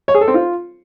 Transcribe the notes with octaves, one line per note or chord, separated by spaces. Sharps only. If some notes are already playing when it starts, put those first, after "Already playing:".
C#5
G#4
A4
C4
F4